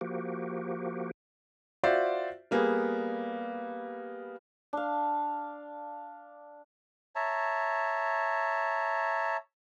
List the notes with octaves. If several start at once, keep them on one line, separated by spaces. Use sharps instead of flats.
F3 A#3 F#4 G4
F4 F#4 C5 D5 E5
G3 A#3 B3 G#4
D4 F5
C#5 E5 A5 A#5